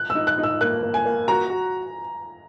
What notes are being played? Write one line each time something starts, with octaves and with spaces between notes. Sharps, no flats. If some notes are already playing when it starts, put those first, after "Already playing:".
Already playing: F#6
E6
D#4
F#6
D#4
E6
A#3 F#6
A#3
G#5
A#3
F#4 A#5
F#4